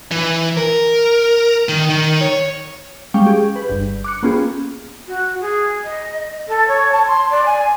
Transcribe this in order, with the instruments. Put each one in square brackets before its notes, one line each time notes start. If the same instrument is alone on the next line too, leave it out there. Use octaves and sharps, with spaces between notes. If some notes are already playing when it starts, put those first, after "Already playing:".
[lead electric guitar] E3
A#4
D#3
D#3
C#5
[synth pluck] G3 G#3 C#4 F5 G5 C#6
G4 G#4
B4
G1 G2 G6
D6 F#6 C#7
A#3 B3 C#4 F4 G4 G#4
[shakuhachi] F#4
G#4
D#5
A4
C#5
A5
C6
D5
G#5